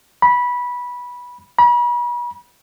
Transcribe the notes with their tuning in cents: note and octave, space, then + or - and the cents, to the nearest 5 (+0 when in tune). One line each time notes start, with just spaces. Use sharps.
B5 -15
B5 -40